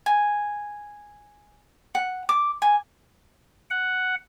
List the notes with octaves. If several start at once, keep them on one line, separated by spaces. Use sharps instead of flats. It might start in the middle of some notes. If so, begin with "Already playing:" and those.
G#5
F#5
D6
G#5
F#5